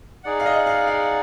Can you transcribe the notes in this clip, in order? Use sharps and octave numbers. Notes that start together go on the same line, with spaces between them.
D#4 G#4 D5 F#5
F5
D#5
F5
F5